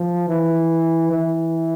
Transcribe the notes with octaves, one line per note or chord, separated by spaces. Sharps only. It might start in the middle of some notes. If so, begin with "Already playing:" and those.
Already playing: F3
E3
E3